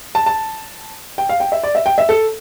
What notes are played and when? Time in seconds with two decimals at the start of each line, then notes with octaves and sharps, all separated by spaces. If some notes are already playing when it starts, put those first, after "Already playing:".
0.15 A5
0.26 A5
1.18 G5
1.29 F5
1.40 G5
1.52 E5
1.63 D5
1.75 E5
1.86 G5
1.98 E5
2.09 A4